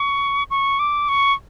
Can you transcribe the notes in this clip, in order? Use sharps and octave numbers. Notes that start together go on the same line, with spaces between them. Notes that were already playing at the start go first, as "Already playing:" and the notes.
Already playing: C#6
C#6
D6
C#6